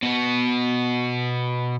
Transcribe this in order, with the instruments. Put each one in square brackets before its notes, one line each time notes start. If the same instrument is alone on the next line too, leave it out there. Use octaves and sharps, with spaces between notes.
[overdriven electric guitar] B2 B3